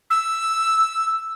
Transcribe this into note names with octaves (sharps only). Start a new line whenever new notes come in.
E6